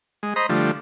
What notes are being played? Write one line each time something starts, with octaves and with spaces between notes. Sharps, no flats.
G#3
C5 D#5 A#5 B5
D3 F3 G3 A3